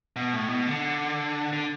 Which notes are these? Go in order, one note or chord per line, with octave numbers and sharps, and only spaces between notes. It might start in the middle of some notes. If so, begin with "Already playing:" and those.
B2
A2
B2
D3
D3